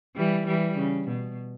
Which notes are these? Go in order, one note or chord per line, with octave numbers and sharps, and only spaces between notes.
E3 G3
E3 G3
C#3
B2